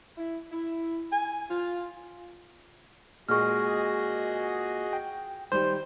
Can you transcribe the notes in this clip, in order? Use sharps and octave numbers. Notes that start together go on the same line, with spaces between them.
E4
E4
G#5
F4
A#2 G#3 F#4 G#4 D#5 C#6 F6
G5
D#3 G3 C5